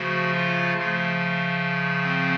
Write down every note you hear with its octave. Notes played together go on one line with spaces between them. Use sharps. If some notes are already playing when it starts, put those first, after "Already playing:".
Already playing: C#3 F3 A3 F#4
F4
C#3 F3 A3
C4